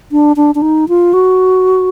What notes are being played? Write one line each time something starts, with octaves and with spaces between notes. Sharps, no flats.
D4
D4
D4
D#4
F4
F#4